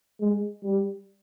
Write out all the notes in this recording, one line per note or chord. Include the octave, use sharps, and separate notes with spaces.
G#3
G3